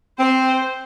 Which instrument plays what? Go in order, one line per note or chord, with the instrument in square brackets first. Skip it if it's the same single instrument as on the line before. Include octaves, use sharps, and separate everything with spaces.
[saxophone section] C4 [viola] C5